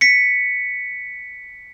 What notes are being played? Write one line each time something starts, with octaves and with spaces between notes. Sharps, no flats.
B6 C#7